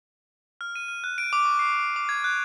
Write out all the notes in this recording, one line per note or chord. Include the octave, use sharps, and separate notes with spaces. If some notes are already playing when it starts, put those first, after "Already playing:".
F6
D#7
F6
F#6
D7
D6
C#6
C7
D6
G#6
F#6